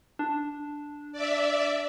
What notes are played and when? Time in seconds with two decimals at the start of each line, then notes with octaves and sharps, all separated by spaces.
0.19 D4
1.12 D5 E5